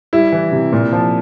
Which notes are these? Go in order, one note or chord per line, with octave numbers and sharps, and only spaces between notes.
G3 E4
E3
C3
A#2
F3